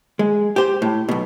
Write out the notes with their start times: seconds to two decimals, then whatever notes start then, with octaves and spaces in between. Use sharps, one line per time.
0.19 G#3
0.56 G4 C5
0.82 A2
1.09 B1 B2